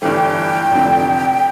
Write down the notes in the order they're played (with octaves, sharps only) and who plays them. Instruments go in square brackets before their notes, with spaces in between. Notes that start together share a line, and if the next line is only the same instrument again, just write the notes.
[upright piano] G1 G2 E3 A3 [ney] G5
[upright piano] F1 F2 D3